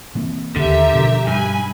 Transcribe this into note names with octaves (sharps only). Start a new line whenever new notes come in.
E3 A#3 C4
D#2 D3 G4 A#4 E5
B2 F3
G2 G#5 B5